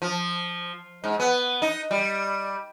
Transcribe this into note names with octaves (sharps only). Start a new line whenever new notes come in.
F3
G#2
B3
D#4
G3